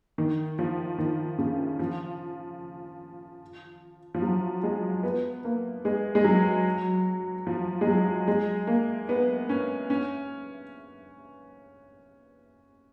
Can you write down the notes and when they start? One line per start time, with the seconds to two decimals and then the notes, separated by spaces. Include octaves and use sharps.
0.18 D#3
0.59 F3
0.98 D#3
1.38 C#3
1.79 F3
4.14 F3
4.22 F#3
4.63 G#3
5.03 B3
5.45 A#3
5.85 G#3
6.15 G#3
6.24 F#3
7.47 F3
7.81 G#3
7.87 F#3
8.28 G#3
8.67 A#3
9.09 B3
9.49 C#4
9.90 C#4